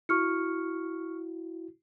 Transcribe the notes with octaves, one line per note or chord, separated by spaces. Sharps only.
E4 F#4 C#6 F6 C#7